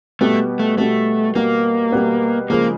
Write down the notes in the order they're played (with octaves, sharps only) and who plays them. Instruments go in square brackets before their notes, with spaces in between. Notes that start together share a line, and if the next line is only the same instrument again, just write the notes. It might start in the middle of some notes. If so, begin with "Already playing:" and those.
[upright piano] B2 G3 B3 [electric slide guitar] A3
[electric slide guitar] A3
[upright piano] B2 G3 B3 [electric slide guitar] A3
[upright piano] B2 G3 B3 [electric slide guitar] A#3
[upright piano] B2 G3 B3
[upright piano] C#3 F3 G#3 [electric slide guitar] A#3